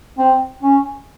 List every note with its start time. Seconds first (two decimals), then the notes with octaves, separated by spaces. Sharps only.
0.19 C4
0.63 C#4